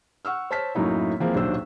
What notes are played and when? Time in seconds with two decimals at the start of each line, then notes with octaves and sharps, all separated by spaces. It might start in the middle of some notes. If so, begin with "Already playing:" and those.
0.25 F#5 C#6 E6 F6
0.51 C5 C#5 A5 F6 B6
0.75 F#2 A2 F#3 A#3 D#4 E4
1.20 E3 F3 G#3 A#3 C4
1.35 D#1 B1 F#3 D4 C5 E6